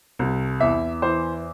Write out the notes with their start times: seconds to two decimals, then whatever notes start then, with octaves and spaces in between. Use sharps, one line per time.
0.19 C2
0.60 E2 E5
1.02 E3 C5